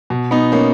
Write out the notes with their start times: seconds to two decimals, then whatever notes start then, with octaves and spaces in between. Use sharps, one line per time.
0.10 B2
0.31 B3 D#4
0.52 A#3 C#4